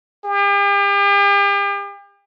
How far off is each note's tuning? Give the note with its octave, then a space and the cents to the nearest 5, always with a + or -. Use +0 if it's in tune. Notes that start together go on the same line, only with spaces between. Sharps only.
G4 +40